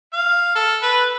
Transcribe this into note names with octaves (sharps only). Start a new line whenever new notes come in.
F5
A4
B4